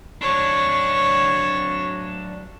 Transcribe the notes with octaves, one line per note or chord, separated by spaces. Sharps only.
F#3 D4 C#5